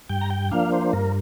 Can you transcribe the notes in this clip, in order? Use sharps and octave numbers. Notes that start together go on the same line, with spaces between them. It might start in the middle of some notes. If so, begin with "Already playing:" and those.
G2 G5
A#5
G5
F3 A#3 D4 F5
C5
G2 A#4